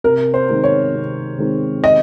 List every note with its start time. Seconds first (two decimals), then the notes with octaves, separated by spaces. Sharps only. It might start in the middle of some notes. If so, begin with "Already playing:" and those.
0.04 C3 A#4
0.34 C5
0.49 D#3 G#3 C4 D#4
0.64 C#5
0.94 C3
1.38 D#3 G#3 C4 D#4
1.84 D#5